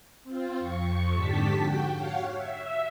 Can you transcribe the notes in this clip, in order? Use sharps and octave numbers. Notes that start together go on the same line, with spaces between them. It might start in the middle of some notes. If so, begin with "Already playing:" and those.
C4 F4
F2 C#6
G#2 D3 G4 A5 B6
F#4 G5
C#5 F5 F#5
E5